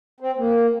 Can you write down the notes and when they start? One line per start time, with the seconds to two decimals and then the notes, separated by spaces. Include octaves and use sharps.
0.20 C4
0.38 A#3